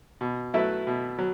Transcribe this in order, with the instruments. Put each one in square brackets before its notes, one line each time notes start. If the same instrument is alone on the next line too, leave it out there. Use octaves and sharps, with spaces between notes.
[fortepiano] B2
F#3 A3 E4 B4
B2
F#3